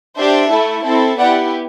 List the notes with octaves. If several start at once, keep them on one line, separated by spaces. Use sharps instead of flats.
D4 G4 C5 E5
A3 E4 A4
C4 E4 A4
B3 E4 G4 D5 F#5